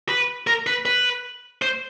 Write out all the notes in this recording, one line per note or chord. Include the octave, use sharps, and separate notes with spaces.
B4
A#4
B4
B4
C5